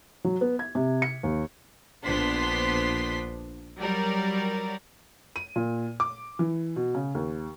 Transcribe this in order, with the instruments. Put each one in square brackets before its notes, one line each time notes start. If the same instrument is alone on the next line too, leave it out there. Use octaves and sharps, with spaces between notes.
[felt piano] F#3
B3
G#6
C3
C#7
D#2
[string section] A#1 B3 D4 C5 C6 B6
F#3 G3 A#4 D5
[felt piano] D#7
A#2
D6
E3
B2
C#3
D#2